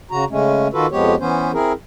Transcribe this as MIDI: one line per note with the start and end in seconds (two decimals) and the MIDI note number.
0.11 0.25 49
0.11 0.25 66
0.11 0.25 82
0.30 0.68 49
0.30 0.68 56
0.30 0.68 57
0.30 0.68 61
0.73 0.87 51
0.73 0.87 65
0.73 0.87 66
0.73 0.87 69
0.73 0.87 71
0.92 1.15 41
0.92 1.15 53
0.92 1.15 56
0.92 1.15 59
0.92 1.15 67
0.92 1.15 73
1.20 1.52 52
1.20 1.52 59
1.20 1.52 61
1.20 1.52 72
1.53 1.73 60
1.53 1.73 64
1.53 1.73 68
1.53 1.73 70